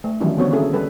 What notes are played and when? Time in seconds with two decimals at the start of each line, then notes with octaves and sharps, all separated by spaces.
0.04 A3
0.21 D#3 E3 F#3 G3 C#4 E4
0.37 D3 G3 B3 C4 F#4 C#5
0.51 A#3 C#4 E4 G#4 A4
0.73 G3 A4 B4